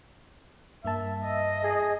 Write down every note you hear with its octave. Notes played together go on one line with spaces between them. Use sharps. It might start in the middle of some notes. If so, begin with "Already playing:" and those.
G2 A#3 E5 A5
D#5
G#4